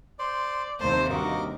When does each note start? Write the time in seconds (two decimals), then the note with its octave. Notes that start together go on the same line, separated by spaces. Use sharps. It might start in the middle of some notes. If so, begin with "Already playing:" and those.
0.19 C5 D5 C6
0.80 D#2 C3 C5 A5 C6
1.10 G2 F#4 A#4 D#5 D6